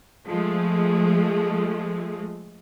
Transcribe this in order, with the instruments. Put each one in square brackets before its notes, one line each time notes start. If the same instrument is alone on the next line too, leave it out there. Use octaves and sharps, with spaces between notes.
[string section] F3 G#3 A3